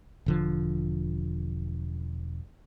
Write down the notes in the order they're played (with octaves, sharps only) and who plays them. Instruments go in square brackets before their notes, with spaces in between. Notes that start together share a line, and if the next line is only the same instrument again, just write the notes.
[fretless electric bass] E1 D3 F3